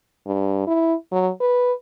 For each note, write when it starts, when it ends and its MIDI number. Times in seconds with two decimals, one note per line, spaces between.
0.27 0.66 43
0.67 0.94 64
1.12 1.30 54
1.41 1.73 71